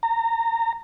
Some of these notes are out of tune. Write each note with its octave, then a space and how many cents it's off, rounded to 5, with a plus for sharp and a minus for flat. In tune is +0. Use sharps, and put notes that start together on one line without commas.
A#5 -25